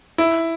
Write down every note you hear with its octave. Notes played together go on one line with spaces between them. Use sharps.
E4